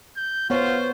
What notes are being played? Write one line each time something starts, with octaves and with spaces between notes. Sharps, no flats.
G6
B3 F4 C5 C#5